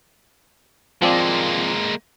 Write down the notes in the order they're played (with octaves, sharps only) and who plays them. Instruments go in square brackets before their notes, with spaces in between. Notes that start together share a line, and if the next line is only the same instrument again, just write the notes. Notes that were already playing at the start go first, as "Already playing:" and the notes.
[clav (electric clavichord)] F3 C4 D5 [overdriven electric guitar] G#3 A#3